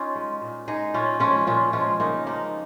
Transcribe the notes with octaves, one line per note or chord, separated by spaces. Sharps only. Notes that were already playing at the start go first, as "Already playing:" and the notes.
Already playing: C#4 D#4 F4
G#3
A#2
G#3 D#4 G#4
A#2 C#4 F4
F3 G#3 C#4 F4
A#2 C#4 F4
F3 G#3 C#4 F4
C#3 A#3 D#4
F3 G#3 A#3 D#4